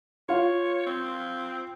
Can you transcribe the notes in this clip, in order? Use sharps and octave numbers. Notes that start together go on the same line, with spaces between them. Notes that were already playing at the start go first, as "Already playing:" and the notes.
F4 C#5 F5
C4